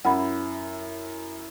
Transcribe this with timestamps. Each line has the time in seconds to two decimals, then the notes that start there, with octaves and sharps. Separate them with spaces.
0.05 F#2 E4 F#5 B5